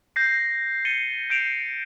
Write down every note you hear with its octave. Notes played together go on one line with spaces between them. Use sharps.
G6 A#6 C7
A6 C#7 D#7 G7
G6 C7 D7 E7 F7